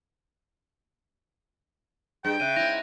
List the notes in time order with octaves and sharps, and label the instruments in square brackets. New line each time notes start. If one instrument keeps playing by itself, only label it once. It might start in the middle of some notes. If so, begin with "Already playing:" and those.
[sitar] G2 [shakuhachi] G#4 [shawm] G5
[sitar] C#3 [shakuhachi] E5 [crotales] F#6 D#7
[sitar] G#2 E4 [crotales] A#6 D#7 F7